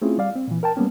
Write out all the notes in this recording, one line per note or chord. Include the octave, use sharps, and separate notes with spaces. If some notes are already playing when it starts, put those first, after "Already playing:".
A3 C4 C#4 E4 F4 G#4
G3 D5 F5
C4
A#2 E3
A#4 G5 A5
G3 A#3 B3 C#4